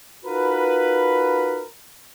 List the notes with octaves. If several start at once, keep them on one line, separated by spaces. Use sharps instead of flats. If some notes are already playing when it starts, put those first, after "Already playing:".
D#4 F4 F#4 A#4 B4